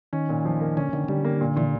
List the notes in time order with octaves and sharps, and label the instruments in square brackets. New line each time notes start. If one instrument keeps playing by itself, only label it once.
[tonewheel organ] D#3 [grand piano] C#4
[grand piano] A#2
F3
A#3
[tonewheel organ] D3 [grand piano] C#4
[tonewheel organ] D3 [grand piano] D#3
[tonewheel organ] D3 [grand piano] G3
[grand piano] A#3
A#2
[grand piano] A#2 [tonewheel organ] E3